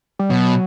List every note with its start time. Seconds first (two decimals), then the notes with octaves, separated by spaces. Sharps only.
0.19 G3
0.30 B2 F#3